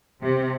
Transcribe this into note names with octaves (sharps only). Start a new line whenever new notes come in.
C3